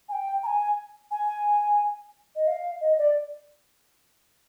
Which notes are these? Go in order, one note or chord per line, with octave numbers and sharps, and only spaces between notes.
G#5
G5
A#5
G#5
G#5
D#5
F5
D#5
D5